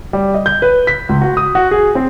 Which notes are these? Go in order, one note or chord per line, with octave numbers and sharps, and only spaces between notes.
G3
D#5
G6
B4
B6
C#2
F#4
D#6
F#4
G#4
C4